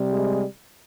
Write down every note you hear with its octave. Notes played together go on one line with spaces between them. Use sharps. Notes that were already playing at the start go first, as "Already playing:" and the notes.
Already playing: C3 G3
G#3